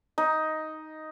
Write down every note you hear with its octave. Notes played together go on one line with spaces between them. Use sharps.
D#4